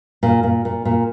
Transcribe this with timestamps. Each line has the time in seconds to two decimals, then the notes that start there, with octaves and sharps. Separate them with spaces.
0.23 A#2
0.43 A#2
0.65 A#2
0.85 A#2